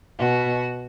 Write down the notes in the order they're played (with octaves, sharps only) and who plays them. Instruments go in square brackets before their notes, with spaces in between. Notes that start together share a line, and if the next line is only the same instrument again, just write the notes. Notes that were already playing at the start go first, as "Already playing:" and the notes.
[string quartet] B2 F#4